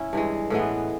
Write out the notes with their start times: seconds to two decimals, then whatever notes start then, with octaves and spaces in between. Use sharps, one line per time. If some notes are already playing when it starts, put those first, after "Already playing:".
Already playing: C#4 E4
0.13 G2 E3 G#3
0.50 A2 E3 G#3 B3